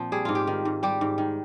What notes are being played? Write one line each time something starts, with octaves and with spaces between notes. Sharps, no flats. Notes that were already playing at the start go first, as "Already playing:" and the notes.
Already playing: A#2 F3 C4
G3 G#4
G#2 F4
G4
D#3
G#2
G3 G4
G#2
D#3